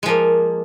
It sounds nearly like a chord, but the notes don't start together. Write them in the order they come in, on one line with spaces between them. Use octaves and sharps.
G#3 F3 A#3